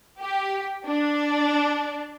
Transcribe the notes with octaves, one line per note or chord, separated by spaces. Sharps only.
G4
D4